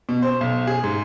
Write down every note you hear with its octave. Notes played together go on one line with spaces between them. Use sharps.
B2
C5
B1
G#4
G#2